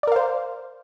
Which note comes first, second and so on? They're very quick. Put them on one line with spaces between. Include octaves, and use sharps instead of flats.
D5 A#4 F5 C5